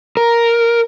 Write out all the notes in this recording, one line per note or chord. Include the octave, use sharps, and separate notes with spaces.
A#4